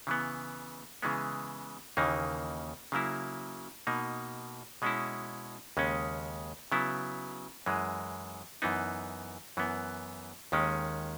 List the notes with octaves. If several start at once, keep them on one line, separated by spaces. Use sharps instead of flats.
C#3 E3 B3
C#3 E3 G#3 B3
D#2 C#3 E3 A#3 D#4
C#3 F#3 A#3 E4
B2 A#3 D#4
B2 G#3 C#4 E4
D#2 C#3 G#3 C#4
C#3 F#3 B3 E4
F#2 E3 G#3
F#2 E3 B3 D#4
F#2 E3 B3
D#2 D#3 G#3 C#4